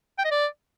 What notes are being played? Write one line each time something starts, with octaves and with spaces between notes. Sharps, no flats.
G5
D#5
D5